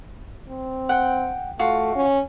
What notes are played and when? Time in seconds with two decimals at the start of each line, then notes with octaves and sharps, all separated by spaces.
0.48 C4
0.89 F#5 G5
1.59 A3 F4 F#4
1.95 C#4